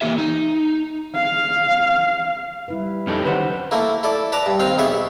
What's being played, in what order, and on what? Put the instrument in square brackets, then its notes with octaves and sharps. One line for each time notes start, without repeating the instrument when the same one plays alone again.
[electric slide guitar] E3 A#3 G4 E5
D#4
[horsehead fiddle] F5
[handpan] G3 E4 B4
[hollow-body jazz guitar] F2 A4 [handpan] F#3 [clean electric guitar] C#4 D#4 G4
[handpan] D3 D#3 [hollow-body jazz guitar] B4 C5 F#5
[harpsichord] A3 A#3 E4
E4 A4 D5
B4 D5 A5 A#5
G2
D#2 C4 F5
B1 B3 G#4 E5 C#6